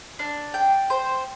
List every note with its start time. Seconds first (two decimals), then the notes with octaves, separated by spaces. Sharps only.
0.19 D4
0.54 G5
0.90 C5